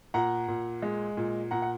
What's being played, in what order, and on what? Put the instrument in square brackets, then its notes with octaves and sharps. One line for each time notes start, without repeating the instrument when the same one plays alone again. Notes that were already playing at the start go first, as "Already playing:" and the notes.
[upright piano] A#2 F#5 A#5
A#2
G#3
A#2
A#2 F#5 A#5
F#5